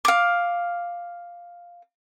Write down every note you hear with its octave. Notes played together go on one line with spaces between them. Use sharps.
F5 D6